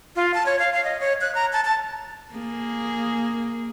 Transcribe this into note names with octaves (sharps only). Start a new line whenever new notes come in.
F4
A5
C#5
F5
F5
D#5
C#5
F#6
A#5
A5
A5
A#3 G#4